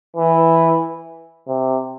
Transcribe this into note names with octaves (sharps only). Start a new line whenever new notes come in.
E3
C3